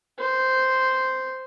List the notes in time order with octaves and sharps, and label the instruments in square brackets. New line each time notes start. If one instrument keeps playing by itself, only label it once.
[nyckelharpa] C5